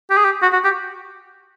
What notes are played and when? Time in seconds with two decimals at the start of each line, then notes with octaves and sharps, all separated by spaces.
0.11 G4
0.17 G#4
0.25 G4
0.42 F#4
0.53 F#4
0.64 G4